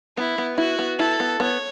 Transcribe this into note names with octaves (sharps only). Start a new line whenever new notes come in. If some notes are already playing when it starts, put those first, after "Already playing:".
B3 E4
B3
E4 F#4
B3
E4 A4
B3
B3 C#5